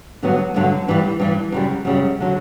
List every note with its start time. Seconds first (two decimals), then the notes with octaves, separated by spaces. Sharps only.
0.23 G2 D3 F#3 B3
0.54 G2 D3 F#3 B3
0.88 G2 E3 G3
1.20 G2 E3 G3
1.52 F#2 C#3 G3
1.85 F#2 C#3 G3
2.20 D3 F#3